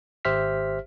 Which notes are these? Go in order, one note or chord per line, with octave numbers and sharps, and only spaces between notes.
G#1 G4 C5 E5 F6 B6